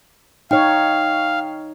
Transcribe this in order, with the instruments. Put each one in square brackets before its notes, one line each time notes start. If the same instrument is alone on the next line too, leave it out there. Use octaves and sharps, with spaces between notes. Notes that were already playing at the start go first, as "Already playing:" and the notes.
[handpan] D#4 C#5 [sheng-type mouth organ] F5 [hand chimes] G5